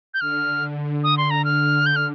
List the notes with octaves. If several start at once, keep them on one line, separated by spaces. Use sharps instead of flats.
G6
D3 F6
D#6
C6
A#5
F6
G6
F6